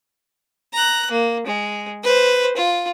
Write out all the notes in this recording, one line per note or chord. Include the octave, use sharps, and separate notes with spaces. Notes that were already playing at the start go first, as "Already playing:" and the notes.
A#5 F#6
A#3
G#3
B4 C5
F4